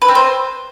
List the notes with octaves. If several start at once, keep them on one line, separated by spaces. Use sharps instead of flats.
B4
C4
C5